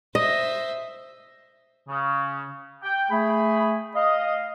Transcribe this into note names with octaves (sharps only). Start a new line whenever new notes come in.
C5 D#5 E5
C#3
G5
A3 G#4 B5
D#5 F5